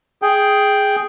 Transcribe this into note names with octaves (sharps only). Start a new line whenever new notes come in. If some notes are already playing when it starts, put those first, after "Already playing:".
G#4 G5